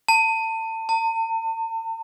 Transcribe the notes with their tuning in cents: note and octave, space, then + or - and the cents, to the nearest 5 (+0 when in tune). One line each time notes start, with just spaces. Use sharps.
A5 +30
A5 +45